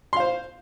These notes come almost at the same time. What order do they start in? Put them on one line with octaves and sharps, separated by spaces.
C6 F5 C5